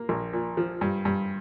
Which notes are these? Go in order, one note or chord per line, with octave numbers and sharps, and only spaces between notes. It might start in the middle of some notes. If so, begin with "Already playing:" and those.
Already playing: A#3
A#1
A#2
F3
G2
G2